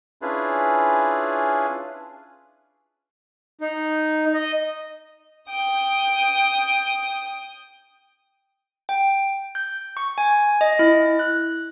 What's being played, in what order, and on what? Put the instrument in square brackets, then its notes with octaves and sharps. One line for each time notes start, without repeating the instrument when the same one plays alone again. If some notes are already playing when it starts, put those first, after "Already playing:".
[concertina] C#4 D4 E4 F4 G#4 B4
[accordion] D#4
D#5
[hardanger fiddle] G5 D#6
[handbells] G5
G6
C#6
G#5
D#5
E4
F#6